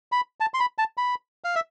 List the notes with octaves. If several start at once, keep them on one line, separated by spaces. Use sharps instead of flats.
B5
A5
C6
B5
A5
B5
F5
E5